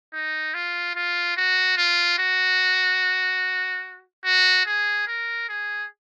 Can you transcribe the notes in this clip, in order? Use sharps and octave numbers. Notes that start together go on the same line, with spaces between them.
D#4
F4
F4
F#4
F4
F#4
F#4
G#4
A#4
G#4